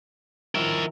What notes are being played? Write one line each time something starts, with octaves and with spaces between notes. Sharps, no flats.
D#3 F3 E4 A#4 E5